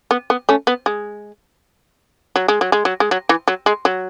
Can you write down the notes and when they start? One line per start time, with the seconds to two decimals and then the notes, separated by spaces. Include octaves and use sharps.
0.11 B3
0.30 B3
0.49 A3 C#4
0.67 B3
0.86 G#3
2.36 F#3
2.48 G#3
2.61 F#3
2.72 G#3
2.85 F#3
3.00 G#3
3.11 F#3
3.29 E3
3.48 F#3
3.66 G#3
3.85 F#3